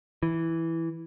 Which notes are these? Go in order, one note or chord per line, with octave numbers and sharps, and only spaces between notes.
E3